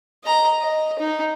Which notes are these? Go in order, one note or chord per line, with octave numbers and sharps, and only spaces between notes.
D#5 A#5
D#5
D#4